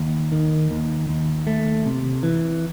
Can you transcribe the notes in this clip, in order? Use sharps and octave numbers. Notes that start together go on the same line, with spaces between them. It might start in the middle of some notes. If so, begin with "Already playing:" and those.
Already playing: D#2
D#3
D#2
D#2
A3
C3
E3